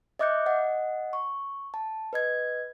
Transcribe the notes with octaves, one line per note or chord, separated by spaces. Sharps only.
D#5 E5 D6 F#6 G6 C#7
D#5 F#5
C#6
A5
B4 D#5 G#6